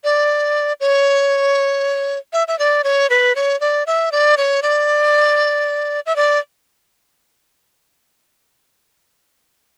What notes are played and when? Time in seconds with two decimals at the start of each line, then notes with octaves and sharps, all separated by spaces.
0.04 D5
0.80 C#5
2.33 E5
2.48 E5
2.59 D5
2.84 C#5
3.10 B4
3.36 C#5
3.60 D5
3.87 E5
4.12 D5
4.37 C#5
4.63 D5
6.06 E5
6.16 D5